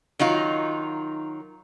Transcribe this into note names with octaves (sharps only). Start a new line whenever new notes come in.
D#3 F#3 D#4 F4